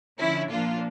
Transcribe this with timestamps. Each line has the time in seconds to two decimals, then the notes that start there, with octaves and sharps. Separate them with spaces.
0.18 D3 F3 C#4 E4
0.50 A#2 F3 A#3 D4 F4